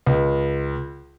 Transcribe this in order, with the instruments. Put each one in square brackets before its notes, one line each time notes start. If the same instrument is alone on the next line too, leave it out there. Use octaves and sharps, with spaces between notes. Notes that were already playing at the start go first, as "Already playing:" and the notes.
[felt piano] C#2